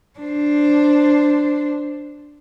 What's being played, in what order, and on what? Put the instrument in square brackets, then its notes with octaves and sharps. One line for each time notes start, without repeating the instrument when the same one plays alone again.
[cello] D4 C5